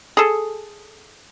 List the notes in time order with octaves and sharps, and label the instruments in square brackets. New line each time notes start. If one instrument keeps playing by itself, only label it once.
[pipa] G#4 A4